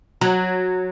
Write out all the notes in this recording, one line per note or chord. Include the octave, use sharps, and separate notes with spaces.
F#3